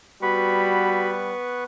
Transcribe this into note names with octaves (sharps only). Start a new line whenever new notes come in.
G3 B3 F#4 B4 B5 C#6